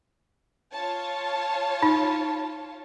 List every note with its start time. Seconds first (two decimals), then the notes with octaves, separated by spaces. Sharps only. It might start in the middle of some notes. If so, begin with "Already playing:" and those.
0.73 F4 C#5 A5
1.82 D#4